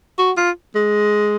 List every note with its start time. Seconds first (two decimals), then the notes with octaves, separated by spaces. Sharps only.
0.19 F#4
0.37 F4
0.75 G#3